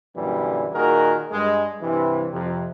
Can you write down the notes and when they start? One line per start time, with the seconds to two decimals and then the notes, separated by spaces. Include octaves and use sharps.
0.15 F#2 A#2 D3 E3 G3
0.73 A#2 D#3 F#4 G#4 A#4
1.31 G2 G#3
1.81 G2 C3 E3
2.31 F2 C3